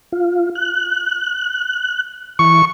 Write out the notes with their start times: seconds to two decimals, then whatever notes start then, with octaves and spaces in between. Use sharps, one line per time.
0.12 F4
0.55 F#6
2.39 E3 C#6